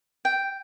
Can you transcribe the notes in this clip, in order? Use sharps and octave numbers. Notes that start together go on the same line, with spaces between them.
G5